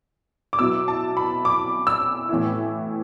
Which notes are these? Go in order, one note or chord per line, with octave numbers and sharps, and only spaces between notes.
D6
B2 F#3 B3 E4 E6
A5
B5
D6
E6
A2 E3 B3 E4